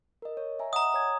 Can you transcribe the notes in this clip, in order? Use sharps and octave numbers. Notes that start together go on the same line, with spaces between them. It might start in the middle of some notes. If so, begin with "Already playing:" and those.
A#4 D#5
C#5
E5 G#5 A#5
D#5 F#5 A#5 D#6
C#5 G#5 G#6